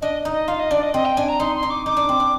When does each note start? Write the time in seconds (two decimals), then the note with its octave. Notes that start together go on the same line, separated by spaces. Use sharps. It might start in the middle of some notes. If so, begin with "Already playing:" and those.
0.02 D4 D#5
0.25 D#4
0.32 D#5
0.48 F4 F5
0.59 D#5
0.71 D4 D5
0.83 D#5
0.94 C4 D#5
1.05 G5
1.17 D4 G#5
1.28 A#5
1.39 D#4 C6
1.56 C6
1.63 D#4
1.70 D6
1.86 D#4 D6
1.97 D4
2.09 C4
2.20 D4